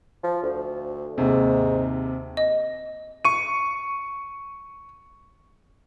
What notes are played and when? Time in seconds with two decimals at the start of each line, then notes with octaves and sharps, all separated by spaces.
0.24 F3
0.43 D2
1.18 D#2 G#2 C3
2.37 D#5
3.25 C#6 D#7